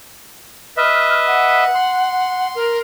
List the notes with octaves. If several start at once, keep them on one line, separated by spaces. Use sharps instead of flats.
B4 D#5 E5 F6
F#5
C6
A#4